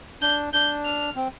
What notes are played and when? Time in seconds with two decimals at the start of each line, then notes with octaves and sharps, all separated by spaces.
0.22 D4 G6
0.53 D4 G6
0.85 F6
1.16 C4